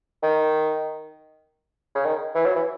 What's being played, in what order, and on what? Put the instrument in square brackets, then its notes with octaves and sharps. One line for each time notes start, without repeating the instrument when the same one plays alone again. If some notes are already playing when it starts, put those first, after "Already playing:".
[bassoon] D#3
C#3
D#3
E3
F#3
E3